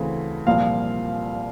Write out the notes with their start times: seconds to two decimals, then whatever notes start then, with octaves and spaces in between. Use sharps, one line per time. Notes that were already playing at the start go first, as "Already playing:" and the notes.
Already playing: D2 C#3 E3 A3 C4
0.47 C2 A#2 F3 A#3 F5